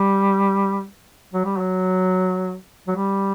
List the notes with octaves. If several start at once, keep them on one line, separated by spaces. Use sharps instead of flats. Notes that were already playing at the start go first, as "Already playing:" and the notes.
Already playing: G3
F#3
G3
F#3
F#3
G3